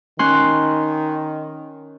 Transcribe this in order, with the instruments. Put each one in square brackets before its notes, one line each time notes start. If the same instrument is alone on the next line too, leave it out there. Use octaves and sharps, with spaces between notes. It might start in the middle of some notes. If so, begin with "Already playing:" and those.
[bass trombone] D#3 [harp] C#4 C6 F#6